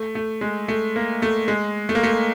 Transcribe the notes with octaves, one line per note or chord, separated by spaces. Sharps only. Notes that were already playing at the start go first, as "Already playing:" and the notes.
Already playing: A3
A3
G#3
A3
A#3
A3
G#3
A3
A#3
A3